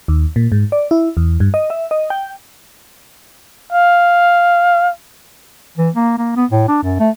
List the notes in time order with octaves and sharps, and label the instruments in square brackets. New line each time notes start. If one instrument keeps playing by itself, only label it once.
[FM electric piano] D#2
A#2
G#2
D5
E4
E2
G2
D#5
E5
D#5
G5
[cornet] F5
[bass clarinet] E3
A#3
A#3
B3
A2
D4
F#2
A3